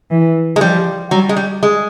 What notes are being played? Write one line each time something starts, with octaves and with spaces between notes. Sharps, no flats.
E3
G#3
F3 G3
F#3 G3
G#3
G3
G#3